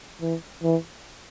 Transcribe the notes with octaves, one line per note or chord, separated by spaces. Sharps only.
E3
E3